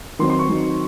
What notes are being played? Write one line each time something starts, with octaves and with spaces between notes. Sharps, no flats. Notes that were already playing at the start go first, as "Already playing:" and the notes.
D#3 F#3 C4 D#4 C6
C6
C#6
D#3 F#3 C4 D#4